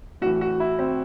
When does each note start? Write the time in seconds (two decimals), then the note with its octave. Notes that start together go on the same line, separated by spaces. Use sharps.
0.21 A2 F#4
0.26 E3
0.41 F#4
0.60 E4
0.79 C4